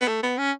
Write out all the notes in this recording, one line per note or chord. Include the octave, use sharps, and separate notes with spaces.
B3
A3
B3
C#4